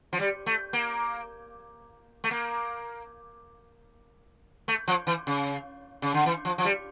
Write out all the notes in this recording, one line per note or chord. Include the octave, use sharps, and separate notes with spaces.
F3
G3
A3
A#3
A3
A#3
A3
F3
E3
C#3
C#3
D3
E3
F3
F3
G3